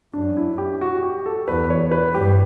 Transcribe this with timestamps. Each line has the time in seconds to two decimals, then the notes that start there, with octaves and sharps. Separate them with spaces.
0.13 F#2 D4
0.37 E4
0.58 G4
0.81 F#4
1.03 G4
1.26 A4
1.48 E2 B4
1.70 C#5
1.91 B4
2.14 G2 G4